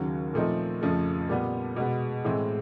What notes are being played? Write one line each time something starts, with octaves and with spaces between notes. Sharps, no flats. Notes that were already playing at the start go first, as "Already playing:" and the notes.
Already playing: D#2 C#3 F#3
A#2 F3 A3 C4 D#4
F2 C#3 F3 A3
A#2 G3 B3
B2 G#3 B3
A2 E3 G#3 C4